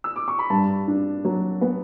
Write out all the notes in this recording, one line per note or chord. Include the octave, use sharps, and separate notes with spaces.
E6
D6
C#6
B5
G2 A5
D4
F#3
B3